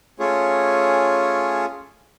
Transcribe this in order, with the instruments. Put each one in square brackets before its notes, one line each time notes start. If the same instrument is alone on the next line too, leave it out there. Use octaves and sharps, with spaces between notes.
[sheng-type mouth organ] A3 C#4 F4 G#4 C#5